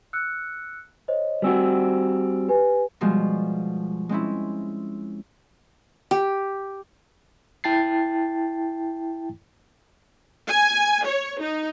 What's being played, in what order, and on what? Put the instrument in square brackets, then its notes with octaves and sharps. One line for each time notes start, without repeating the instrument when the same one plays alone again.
[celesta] E6 F#6 C#7
C5 C#5 D#5
[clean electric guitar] G3 C4 F#4 [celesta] C5 G#5 E6
[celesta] G4 B4 G#5
[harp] B2 F3 G3 G#3
G#3 C4 C#4 E4
[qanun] G4
[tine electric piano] E4 G5 A5 A6 C7
[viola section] G#5
C#5
D#4